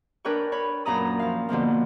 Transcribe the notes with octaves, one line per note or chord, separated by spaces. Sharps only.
D4 A#4 B4 C#5 G5 C#6
C#5 B5
F#2 A#2 C#4 A#5 B5 D#6
F3 F5
B2 D3 F3 A#3